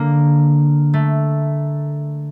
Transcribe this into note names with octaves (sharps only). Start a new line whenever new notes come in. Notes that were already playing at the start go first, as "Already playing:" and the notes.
Already playing: D3 A#3
A3